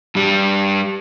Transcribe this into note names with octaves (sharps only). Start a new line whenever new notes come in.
G2 G3